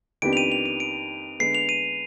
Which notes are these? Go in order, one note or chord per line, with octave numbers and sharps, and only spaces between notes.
F2 D#3 B3 D4 G4 D7
F7
D#7
F7
D#7
D7
D3 G#3 B3 C7
F7
D#7